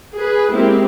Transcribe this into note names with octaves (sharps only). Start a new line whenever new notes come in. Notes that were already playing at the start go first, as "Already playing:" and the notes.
G#4 B4
G#3 A#3 C4 E4 G4